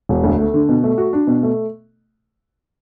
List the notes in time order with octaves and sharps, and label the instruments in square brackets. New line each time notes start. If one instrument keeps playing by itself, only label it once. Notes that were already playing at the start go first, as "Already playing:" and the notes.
[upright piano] E1
D2
A3
D3
B2
A3
F#4
D4
B2
A3